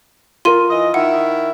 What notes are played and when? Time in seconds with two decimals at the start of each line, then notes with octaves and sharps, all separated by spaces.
0.45 F4 A#4 C6 D#7
0.70 E3 D#5
0.94 D#3 E4 E5 F#5